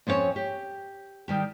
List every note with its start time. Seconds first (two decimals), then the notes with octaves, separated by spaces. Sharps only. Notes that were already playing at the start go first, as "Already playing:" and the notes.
0.07 F2 C4 C#4 F#4 C#5
0.36 G4
1.28 D#3 G3 G4